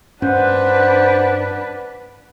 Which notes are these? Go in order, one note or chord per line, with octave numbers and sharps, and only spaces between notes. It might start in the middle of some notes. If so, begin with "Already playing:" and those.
G2 C#4 D4 B4 C5 F#5